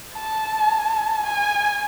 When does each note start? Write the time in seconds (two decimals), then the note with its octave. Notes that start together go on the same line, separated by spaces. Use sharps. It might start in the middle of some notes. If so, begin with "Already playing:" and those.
0.16 A5
1.26 G#5